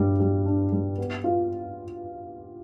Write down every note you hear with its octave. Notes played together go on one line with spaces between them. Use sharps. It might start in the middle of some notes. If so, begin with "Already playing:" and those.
Already playing: G2 G3
G3
D4
G3
B3
F4